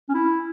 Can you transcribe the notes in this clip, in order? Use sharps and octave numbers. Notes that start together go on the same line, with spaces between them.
C#4
E4